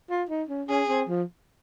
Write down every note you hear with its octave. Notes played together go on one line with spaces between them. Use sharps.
F4
D#4
C#4
C#4 G#4
C4
F3